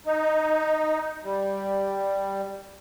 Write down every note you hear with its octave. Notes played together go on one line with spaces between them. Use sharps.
D#4
G3